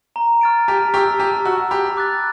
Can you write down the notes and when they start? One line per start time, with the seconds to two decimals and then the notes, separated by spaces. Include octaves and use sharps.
0.16 A#5
0.41 C#6 F6 A6 D7
0.68 G4 A5
0.94 G4 C#6
0.97 E6
1.19 G4 A5
1.45 F#4 C#6 E6
1.71 G4 B5
1.97 D6 F#6 A6